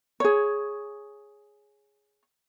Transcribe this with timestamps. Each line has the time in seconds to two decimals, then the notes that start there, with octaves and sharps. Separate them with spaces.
0.20 G#4 C#5